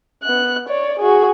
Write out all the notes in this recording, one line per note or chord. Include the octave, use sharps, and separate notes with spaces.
B3 F#6
C#5 D5
F#4 G#4